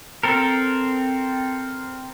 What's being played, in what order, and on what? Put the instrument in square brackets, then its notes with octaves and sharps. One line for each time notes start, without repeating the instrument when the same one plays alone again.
[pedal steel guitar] C4 A4 A#4